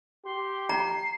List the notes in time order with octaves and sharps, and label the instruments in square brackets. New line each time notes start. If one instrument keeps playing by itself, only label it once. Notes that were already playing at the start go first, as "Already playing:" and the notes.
[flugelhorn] G4 [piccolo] C6
[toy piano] A#5 [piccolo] C7